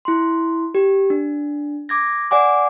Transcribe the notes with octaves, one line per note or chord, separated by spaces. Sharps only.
E4 C6
G4
D4
D6 G#6 A#6
D5 F#5 G#5 D6